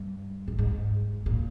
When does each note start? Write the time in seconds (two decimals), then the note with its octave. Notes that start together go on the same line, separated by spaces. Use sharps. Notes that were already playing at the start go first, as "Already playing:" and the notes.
Already playing: G2
0.48 A#2
0.58 G#2
1.26 A#2